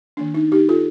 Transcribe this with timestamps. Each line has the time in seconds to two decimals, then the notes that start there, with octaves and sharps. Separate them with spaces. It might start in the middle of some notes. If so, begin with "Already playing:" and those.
0.17 D#3 A#3 D4
0.34 D#4
0.52 D#4 G4
0.69 F4 A4